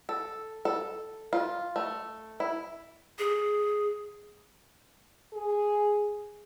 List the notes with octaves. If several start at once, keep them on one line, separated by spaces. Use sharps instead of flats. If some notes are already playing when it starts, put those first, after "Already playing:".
A4
A4
F4
A3
E4
G#4
G#4